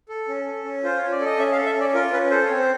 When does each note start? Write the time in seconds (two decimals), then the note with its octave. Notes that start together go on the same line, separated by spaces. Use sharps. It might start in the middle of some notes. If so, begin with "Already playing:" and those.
0.09 A4
0.28 C#4
0.46 A4
0.65 C#4
0.83 F4 C5
0.98 C#4 C#5
1.12 D5
1.21 A4 D#5
1.39 C#4 E5
1.52 F5
1.58 A4
1.66 E5
1.75 C#4
1.80 D5
1.94 F4 A#4
2.13 C#4 B4
2.31 A4 C5
2.45 C4 C#5
2.58 C5